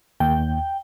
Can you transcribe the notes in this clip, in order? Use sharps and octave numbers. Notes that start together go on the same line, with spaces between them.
D#2 G5